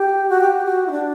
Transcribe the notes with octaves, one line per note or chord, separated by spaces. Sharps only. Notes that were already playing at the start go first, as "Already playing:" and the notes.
Already playing: G4
F#4
G4
F#4
E4
D4